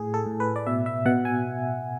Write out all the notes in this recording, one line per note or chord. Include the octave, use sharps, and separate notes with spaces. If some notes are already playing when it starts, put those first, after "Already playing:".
Already playing: A2 G#4
A4
A2
B4
D5
B2 E5
E5
B2 F#5
G#5